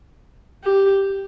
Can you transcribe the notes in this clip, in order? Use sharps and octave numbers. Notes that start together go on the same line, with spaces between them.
G4